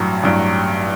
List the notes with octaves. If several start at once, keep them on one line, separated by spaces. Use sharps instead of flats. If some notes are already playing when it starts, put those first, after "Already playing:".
Already playing: A1 G2 F#3
A1 G2 F#3